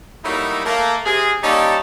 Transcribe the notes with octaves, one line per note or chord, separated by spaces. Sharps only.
F#3 G3 A3 A#3 D#4 E4
A3 A#3
C3 G#4 G#5
G3 A#3 C#4 D#4 G4 A4